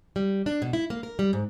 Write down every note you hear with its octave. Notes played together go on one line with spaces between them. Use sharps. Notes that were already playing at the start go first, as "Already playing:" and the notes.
G3
D4
B2
E4
A#3
A#4
G3
G#2